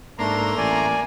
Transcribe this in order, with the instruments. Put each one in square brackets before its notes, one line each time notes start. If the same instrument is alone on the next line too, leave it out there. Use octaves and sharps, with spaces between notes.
[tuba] G#2 [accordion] A3 A#5 C6 [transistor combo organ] A#3 [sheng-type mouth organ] D4
[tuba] A1 [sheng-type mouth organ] D5 G#5